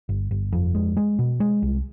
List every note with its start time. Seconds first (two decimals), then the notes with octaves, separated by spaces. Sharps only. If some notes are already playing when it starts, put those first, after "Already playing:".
0.09 G1
0.31 G1
0.53 F2
0.75 G#3
0.97 G#3
1.19 B2
1.40 G#3
1.62 C2